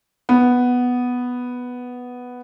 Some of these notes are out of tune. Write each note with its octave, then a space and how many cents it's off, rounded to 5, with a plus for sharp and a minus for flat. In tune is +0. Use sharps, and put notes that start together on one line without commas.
B3 +0